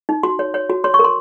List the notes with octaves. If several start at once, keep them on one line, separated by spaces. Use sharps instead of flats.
D#4
F#4 C6
C#5
C#5
F#4
C#5 C6
C#6
A#4
C6